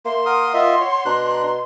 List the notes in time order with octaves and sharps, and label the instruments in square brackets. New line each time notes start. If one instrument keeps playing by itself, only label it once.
[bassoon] A#3 [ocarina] E5 [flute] C6
[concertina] A#4 D#6 [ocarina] F#5
[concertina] F4 D#5 E5 [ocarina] F#5
[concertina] C#5
[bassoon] B2 [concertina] D4 F#6 [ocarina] A#5